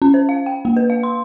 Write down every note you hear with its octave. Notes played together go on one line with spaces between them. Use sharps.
C#4
C5
F5
G5
A#3
B4
F5
C6